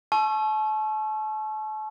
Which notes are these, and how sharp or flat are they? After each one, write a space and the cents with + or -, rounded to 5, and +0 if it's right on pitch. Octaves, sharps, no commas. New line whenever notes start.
A5 -35 C#6 -25 E6 +30